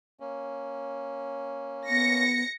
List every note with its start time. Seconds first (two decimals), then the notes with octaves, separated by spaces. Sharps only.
0.20 A#3 C#4
1.89 B3 A#6 C#7